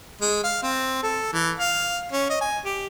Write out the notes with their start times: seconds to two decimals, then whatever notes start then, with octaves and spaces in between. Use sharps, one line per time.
0.21 G#3
0.44 F5
0.63 C4
1.03 A4
1.33 E3
1.59 F5
2.12 C#4
2.30 D#5
2.41 G#5
2.65 G4